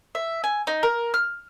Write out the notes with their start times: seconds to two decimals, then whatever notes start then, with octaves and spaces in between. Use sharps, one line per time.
0.15 E5
0.44 G#5
0.67 D#4
0.83 A#4
1.14 F6